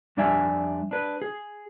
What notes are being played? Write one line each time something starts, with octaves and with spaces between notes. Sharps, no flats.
F2 G3 D4 D5 E5 G#5
D4 B4
G#4